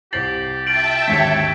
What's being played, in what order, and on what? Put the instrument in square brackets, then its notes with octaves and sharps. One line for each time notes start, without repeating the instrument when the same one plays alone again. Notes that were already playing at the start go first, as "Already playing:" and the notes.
[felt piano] C2 C5 C7 [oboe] G4 [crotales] A6 F#7
[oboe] F4 [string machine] E5 G5 A5 [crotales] D7 F#7
[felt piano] G#1 D#2 D3 [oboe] C#5 [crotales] B6